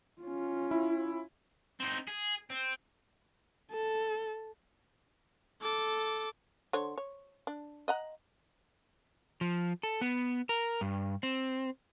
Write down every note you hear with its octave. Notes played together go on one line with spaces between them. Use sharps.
C#4 F4
E4
C4 D#4
G#4
C4
A4
A4 D6
D3 C5 C#5
C#5
D4
D#5 F#5 A#5
F3
A4
B3
A#4
G2
C4